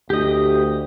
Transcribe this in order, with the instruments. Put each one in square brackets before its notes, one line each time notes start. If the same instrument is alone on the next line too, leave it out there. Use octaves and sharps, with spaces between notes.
[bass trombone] D2 [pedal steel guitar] G4 D#5